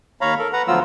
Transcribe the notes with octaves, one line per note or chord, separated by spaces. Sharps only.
D#2 C#5 F5 A#5 B5
A4 A#4
B4 F#5 A#5
D2 F3 F#3 B3 F4 E6